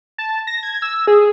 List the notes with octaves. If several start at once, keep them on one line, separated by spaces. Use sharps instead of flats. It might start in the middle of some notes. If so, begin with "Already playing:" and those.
A5
A#6
G#6
E6
G#4